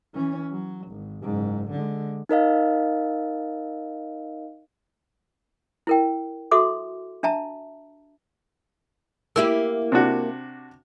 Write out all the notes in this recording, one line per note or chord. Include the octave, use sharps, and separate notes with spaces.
E3 C#4
F#3
G#1
F#1 G#2
D3 G#3
D#4 A#4 D#5 F5
E4 A#4 G5
F#4 A4 E5 C6 D6
D4 E5 A5 A#5
A#3 E4 G4 E6
C3 D4 F#4